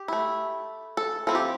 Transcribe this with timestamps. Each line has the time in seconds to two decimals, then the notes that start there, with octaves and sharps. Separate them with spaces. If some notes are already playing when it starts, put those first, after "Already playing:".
Already playing: G4
0.08 A3 E4
0.97 A4
1.27 F3 C4 E4 A4
1.35 G4